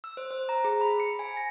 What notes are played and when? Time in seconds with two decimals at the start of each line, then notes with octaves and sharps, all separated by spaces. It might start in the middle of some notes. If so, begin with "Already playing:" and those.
0.04 E6
0.17 C5
0.30 C5
0.49 A#5
0.64 G#4
0.81 B5
1.00 C#7
1.19 G#5
1.37 A#6